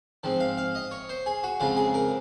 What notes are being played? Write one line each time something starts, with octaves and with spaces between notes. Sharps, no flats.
G#2 F3 C4
F5
F5
D#5
C#5
C5
G#4
F#4
F2 C#3 G#3 F4
G#4
A#4